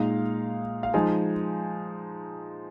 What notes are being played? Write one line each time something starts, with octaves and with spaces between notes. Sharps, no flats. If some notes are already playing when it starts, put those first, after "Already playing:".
Already playing: A#2 G#3 D#4 F5
F5
F3 G#3 D#4 G#5